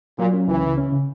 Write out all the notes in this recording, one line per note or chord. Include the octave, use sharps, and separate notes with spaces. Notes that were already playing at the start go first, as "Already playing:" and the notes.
A#2 F#3
C#4
C#2 E3
C#3
C#4
C#3